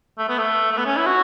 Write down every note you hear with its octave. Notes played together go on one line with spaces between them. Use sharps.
A3
B3
A3
A3
B3
C#4
E4
F#4